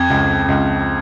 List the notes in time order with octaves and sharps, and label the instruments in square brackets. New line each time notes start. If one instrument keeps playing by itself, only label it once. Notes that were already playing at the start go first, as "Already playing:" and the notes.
Already playing: [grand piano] F2 [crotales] G#6
[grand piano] C#2
C#2